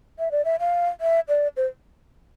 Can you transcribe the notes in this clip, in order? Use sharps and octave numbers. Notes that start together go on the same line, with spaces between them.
E5
D5
E5
F5
E5
D5
C5